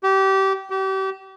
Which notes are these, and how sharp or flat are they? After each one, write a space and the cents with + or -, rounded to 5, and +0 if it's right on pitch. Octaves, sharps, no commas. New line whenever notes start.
G4 -25
G4 -35